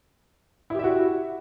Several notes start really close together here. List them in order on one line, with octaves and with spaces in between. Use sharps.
E4 G4 E5 F#4